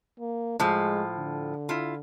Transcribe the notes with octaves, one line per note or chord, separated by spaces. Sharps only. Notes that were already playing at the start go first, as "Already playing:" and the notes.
A#3
A2 F3 G#3
D3
E4 F4